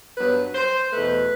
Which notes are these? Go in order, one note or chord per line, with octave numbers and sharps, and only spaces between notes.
G2 F#3 B3 B4
C5
E2 B2 A3 B4